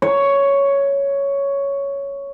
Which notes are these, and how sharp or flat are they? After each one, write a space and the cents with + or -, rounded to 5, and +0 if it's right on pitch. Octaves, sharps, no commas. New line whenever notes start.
C#5 +5